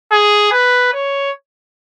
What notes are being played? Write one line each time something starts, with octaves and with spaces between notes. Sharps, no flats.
G#4
B4
C#5